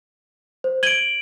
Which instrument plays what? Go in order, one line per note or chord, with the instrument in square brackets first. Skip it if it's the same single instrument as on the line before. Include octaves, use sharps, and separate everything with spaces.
[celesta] C5
[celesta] G#6 D#7 G7 [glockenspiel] D7 F#7